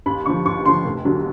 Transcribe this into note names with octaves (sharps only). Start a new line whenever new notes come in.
D#2 B5
D3 F3 C#6
D#2 C#6
D3 F3 C6
F1
D#2 D3 F#3